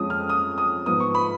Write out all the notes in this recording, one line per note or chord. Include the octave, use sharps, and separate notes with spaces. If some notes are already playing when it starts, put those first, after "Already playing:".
Already playing: F2 F3 G#3 C#4 D#6
F6
D#6
D#6
G#2 F3 B3 D#6
C#6
B5